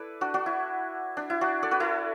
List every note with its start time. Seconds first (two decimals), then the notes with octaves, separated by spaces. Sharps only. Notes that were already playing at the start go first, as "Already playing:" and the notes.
Already playing: E4 A4 B4 D5
0.21 D4 F#4
0.34 D4 F#4
0.46 E4
1.17 D4
1.30 E4
1.41 D4 F#4
1.63 A4 D5
1.71 F#4 B4
1.80 E4 A4